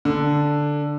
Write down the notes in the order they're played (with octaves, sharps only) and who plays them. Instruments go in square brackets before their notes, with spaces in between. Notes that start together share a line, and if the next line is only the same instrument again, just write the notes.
[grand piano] D3